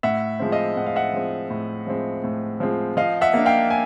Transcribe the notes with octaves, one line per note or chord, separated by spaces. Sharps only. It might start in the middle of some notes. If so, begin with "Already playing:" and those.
A2 E5 F#5
F3 G#3 C4
D#5 F5
A2 F#5
F5
E5 F#5
F3 G#3 C4
A2
F3 G#3 C4
A2
F3 G#3 C4
F3 D#5 F5
E5 F#5
A#3 D4
F5 G5
G#5